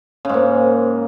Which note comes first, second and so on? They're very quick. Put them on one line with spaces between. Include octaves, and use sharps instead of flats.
C#3 G#2 A#3